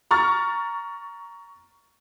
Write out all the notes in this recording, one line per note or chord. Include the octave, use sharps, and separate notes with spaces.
A#5 C#6 F6 A6